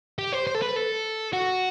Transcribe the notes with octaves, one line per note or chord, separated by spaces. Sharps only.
G4
C5
C5
A4
B4
A4
F#4